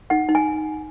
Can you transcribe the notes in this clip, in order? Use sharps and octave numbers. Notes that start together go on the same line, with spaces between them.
D#4 F#5
D#4
G#5